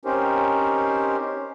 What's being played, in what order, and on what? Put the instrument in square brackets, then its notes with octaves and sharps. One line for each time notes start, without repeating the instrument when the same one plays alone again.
[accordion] C4 C#4 D#4 G4 A#4 C5